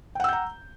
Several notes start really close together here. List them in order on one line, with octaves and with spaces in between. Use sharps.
G5 F#5 E6 G6 A#5